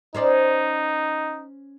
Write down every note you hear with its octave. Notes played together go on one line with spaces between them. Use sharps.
C#4 D#4 C5 D5